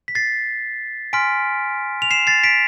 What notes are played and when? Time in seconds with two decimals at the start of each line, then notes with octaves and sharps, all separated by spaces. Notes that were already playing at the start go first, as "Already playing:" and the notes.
0.08 B6
0.15 A6 C7
1.13 G#5 C6 F6 B6 D7
2.02 F7
2.11 C7 E7
2.27 A6 C7
2.43 B6 D7